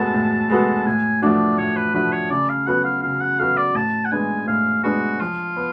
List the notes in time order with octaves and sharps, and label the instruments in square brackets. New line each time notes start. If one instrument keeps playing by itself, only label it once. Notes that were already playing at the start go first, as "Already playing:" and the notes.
Already playing: [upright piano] A2 G#3 B3 F#4 A4 [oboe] A5
[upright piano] A2
G#3 B3 F#4 A4
[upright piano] A2 [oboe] G#5
[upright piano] F3 A3 D4 F#4 [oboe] D5
[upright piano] A2 [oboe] C#5
[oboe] B4
[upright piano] F3 A3 D4 F#4 [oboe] B4
[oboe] C#5
[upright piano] C#3 [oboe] D5
[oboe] F5
[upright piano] F#3 B3 F#4 A4 [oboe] F#5
[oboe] F5
[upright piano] C#3 [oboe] F5
[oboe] F#5
[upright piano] F#3 B3 F#4 A4 [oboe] F5
[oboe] D5
[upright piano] A2 [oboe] A5
[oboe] F#5
[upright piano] G#3 B3 D4 [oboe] G#5
[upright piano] A2 [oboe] F5
[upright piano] G#3 B3 D4 [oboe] F#4
[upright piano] F3 [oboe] F4
[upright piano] B3